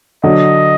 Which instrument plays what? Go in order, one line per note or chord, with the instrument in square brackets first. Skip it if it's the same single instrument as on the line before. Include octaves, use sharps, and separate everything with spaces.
[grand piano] D3 F#3 [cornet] D#5